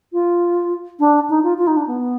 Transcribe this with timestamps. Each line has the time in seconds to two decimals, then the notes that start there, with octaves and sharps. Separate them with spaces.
0.13 F4
1.00 D4
1.30 D#4
1.43 F4
1.58 F4
1.67 D#4
1.77 D4
1.87 B3